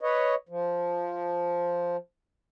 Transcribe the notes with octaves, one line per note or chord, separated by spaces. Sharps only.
B4 C#5 D#5
F3